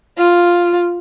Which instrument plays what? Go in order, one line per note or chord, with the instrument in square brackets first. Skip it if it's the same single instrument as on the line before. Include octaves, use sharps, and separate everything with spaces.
[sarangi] F4